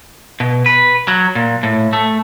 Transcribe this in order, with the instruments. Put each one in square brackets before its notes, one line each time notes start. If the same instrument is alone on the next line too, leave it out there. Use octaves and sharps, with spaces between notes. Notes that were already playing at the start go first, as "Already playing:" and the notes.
[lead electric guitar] B2
B4
F#3
A#2
A2
A3